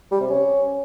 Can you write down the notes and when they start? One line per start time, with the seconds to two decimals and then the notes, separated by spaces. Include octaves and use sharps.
0.11 G3
0.21 C3
0.30 C#4